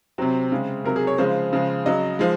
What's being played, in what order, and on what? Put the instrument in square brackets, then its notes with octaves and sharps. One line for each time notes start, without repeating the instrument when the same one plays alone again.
[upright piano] C3 F#3 C4
C#3 G#3
C3 F#3 A#4
G#4
C#5
C#3 F3 G#3 C5
C#3 F3 G#3
C#3 F#3 D#5
F3 G#3